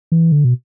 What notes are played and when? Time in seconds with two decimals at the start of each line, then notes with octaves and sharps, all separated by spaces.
0.12 E3
0.32 D3
0.44 B2